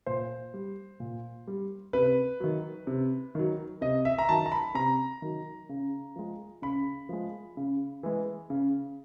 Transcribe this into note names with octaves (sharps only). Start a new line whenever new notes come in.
A#2 C5
G3
A#2
G3
C3 B4
D#3 F#3
C3
D#3 F#3
C3 D#5
E5
A#5
D#3 F#3 A5
A#5
B5
C3 A#5
D#3 F#3
C#3
F3 G#3
C#3 B5
F3 G#3
C#3
E3 G#3
C#3